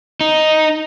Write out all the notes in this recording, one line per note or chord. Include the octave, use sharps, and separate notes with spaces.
D#4